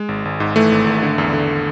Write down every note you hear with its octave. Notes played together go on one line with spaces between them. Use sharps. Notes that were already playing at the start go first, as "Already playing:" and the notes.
Already playing: G#3
G#1
G#1
G#2
E3 A3
G#1
G#1
D3
E2
D3